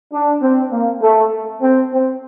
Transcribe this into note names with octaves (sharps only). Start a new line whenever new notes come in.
D4
C4
A#3
A3
C4
C4